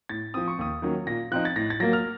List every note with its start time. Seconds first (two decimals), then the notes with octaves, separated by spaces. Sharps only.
0.09 A2 A6
0.34 F3 C4 D#6
0.48 C#6
0.59 D#2 D#6
0.82 D#3 F#3 A#3 C#4
1.07 A#2 A#6
1.31 F3 C4 D#4 F#6
1.45 A6
1.56 A2 A#6
1.70 A6
1.80 F#3 A#3 A#6
1.93 F6